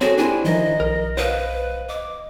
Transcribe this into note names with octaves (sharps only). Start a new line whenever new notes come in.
C4 F#4 G#4 A4 C#5
D4 E4 G4 C5 G#5
D#3 F3 A#4 D#5
B1 A#4
B4 C5 D#5 F5
D#5 D6